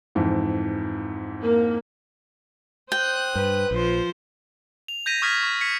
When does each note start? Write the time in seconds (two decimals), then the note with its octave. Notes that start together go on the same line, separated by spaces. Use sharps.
0.15 F2 G#2 E3
1.42 A#3
2.92 C5 G5 D#6 F#6
3.35 G2 B4
3.71 A#1 F3 C5
4.88 F7
5.06 G6 G#6 A#6 B6 D#7 E7
5.22 C#6 D#6 F6 G#6 A6 B6
5.43 C#6
5.61 G#6 B6 C#7